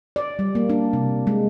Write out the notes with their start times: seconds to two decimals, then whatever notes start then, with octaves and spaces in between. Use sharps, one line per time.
0.16 D5
0.39 G3
0.55 A#3
0.70 D4
0.93 C3
1.27 G#3